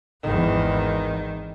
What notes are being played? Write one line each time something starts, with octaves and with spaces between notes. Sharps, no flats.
G#1 E2 D#3